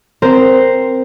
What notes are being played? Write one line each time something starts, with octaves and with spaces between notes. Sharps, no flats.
C4 A#4 C5